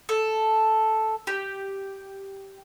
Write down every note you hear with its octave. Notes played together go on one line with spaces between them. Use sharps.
A4
G4